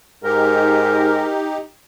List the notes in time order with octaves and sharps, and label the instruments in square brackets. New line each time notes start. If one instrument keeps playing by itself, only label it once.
[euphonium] G#2 [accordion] D#4 G4 [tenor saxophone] A#4